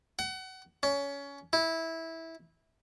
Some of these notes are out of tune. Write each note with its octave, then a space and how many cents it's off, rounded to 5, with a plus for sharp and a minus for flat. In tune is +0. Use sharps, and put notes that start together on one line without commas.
F#5 +30
C#4 +20
E4 -15